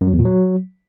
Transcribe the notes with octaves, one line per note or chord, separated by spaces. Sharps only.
F#2
F#3
E2
A#2
F#3